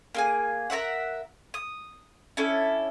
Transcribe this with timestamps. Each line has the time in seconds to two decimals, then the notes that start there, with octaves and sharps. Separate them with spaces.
0.15 A#3 G#4 G#5
0.70 A#4 C#5 E5 F#5
1.54 D#6
2.37 C#4 D4 E4 A4